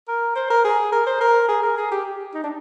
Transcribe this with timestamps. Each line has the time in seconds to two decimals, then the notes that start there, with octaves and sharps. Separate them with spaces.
0.08 A#4
0.36 C5
0.50 A#4
0.64 G#4
0.92 A#4
1.06 C5
1.21 A#4
1.48 G#4
1.63 A#4
1.77 G#4
1.91 G4
2.34 D#4
2.43 D4